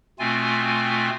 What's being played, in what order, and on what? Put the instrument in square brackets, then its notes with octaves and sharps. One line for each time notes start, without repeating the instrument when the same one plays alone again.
[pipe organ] B2 A3 C4 F4 G#5